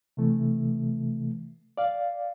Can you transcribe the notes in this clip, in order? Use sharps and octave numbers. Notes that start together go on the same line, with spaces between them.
C3 E3 A3
D5 F5